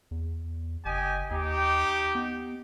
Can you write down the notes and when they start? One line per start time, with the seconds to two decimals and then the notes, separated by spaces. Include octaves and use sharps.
0.11 E2
0.85 F#1 G4 D#5 G#5
1.31 D#2 D#4 G4
2.15 B3